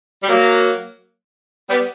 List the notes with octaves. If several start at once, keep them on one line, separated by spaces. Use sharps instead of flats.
G3
F#3 A#3
G3 B3